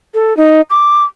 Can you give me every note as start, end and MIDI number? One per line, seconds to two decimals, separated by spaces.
0.14 0.36 69
0.37 0.61 63
0.70 1.03 86